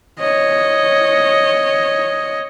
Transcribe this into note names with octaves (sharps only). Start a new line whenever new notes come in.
C#5 D#5